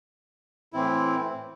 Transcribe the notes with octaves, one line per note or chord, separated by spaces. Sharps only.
A2 E3 C4 E4